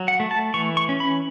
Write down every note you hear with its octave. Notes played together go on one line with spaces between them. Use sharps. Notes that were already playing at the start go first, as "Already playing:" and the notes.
Already playing: F#3
F#5
A3
A5
E3 C#6
C#6
C#4
B5